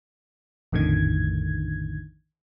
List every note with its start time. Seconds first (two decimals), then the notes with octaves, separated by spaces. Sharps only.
0.72 A#1 F2 A2 D3 D#3 G#6